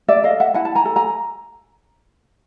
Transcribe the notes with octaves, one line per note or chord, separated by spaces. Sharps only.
D5 E5
A4 D#5 F5
E5 F#5
E4 F#5 G#5
A5
G#5 A#5
A4
G#5 A#5